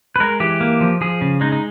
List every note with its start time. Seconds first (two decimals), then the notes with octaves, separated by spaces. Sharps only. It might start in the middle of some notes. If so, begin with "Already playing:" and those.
0.16 B4
0.20 G#3 A#4
0.40 E3 G4
0.61 A#3
0.81 F3
1.01 F3 G#4
1.21 C#3
1.41 G#3 D#4
1.52 D#4